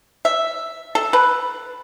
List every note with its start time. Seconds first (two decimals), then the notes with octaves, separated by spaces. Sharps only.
0.25 E5
0.95 A4
1.13 B4